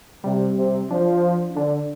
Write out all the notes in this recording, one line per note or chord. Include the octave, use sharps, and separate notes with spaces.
C3 G3
C3
F3 D4
D3 D4